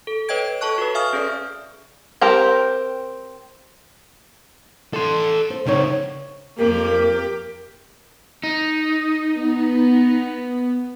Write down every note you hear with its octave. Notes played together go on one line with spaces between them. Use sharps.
A4
B4 C#5 D#5 G5 G#6 D7
A4 C#5 A5 C#6 F#6
F#4 B4
E5 F5 G#5 C#6 D#6 F6
C#4 G#4 A4 B4 D5
C4 G4 A#4
A4 C6
C5
C#3 D#4 G#4 C5 C#5
F2 A#3 G4 A#4
D#4
B3